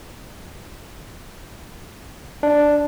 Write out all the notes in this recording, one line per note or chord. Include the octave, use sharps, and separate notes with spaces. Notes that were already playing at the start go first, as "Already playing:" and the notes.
D4